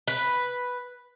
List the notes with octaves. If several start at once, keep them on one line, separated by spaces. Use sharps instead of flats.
B4